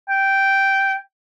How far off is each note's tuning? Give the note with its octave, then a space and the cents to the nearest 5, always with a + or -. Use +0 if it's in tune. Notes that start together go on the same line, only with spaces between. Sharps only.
G5 -10